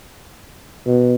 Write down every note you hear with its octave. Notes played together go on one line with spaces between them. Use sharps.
B2